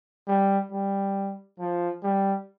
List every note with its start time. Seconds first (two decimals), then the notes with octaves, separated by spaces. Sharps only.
0.27 G3
0.71 G3
1.59 F3
2.03 G3